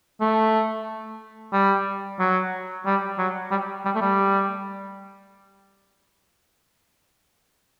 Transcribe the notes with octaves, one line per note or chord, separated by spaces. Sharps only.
A3
G3
F#3
G3
F#3
G3
G3
A3
G3